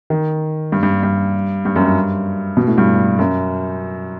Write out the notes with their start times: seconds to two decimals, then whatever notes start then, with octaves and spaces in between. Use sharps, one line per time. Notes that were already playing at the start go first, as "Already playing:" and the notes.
0.10 D#3
0.72 G2
0.83 G2
1.03 G2
1.65 G2
1.76 F#2
1.86 G2
2.57 B2
2.67 A2
2.78 G2
3.19 F#2